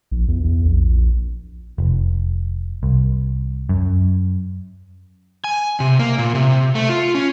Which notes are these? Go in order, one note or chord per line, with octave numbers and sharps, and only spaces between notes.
A#1
E2
E2
A#1
F1
C2
F#2
G#5
C3
A#3
A#2
C3
A3
F4
C#4